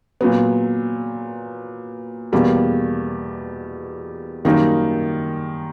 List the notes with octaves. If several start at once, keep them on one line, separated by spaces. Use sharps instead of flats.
A#2 F#3 B3
E2 B2 G3 A#3
F#2 D#3 G3 A#3 D#4